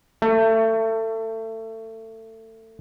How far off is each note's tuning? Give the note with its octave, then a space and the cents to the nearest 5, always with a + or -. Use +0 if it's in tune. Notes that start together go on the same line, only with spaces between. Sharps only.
A3 +25